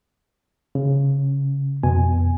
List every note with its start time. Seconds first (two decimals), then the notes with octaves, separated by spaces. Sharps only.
0.75 C#3
1.83 F2 B2 G#5